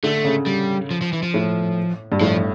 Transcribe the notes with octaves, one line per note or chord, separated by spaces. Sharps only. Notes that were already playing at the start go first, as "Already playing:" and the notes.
D3 A3
C#3
G3
F3
F3
E3
F3
A2
G2
A2 F3